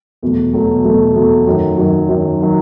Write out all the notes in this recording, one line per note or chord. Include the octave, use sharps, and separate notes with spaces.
E2 B2 F#3 A3
E2 B2 F#3 A3
E2 B2 F#3 A3
E2 B2 F#3 A3
F#2 D#3 F#3
F#2 D#3 F#3
F#2 D#3 F#3
D#3 F#3